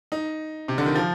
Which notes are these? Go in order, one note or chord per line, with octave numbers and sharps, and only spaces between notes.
D#4
C3
D3
D#3
F3